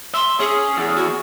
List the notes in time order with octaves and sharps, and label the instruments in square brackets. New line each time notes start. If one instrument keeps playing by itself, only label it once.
[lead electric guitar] E5 [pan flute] C6
[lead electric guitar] C#4 [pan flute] G#4
[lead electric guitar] E2
[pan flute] F#4